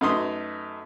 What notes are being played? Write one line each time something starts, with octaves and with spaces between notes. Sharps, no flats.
F#2 A3 D#4 B4 C6 D#6